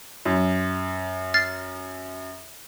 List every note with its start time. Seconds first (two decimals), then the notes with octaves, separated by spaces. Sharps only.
0.25 F#2
1.34 F6 A6 C7